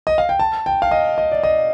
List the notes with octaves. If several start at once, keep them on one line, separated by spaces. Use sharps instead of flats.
D#5
F5
G5
A5
G5
F5
D#5
D#5
D5
D#5